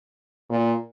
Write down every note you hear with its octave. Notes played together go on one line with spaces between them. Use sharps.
A#2